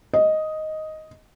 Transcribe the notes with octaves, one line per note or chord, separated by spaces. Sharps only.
D#5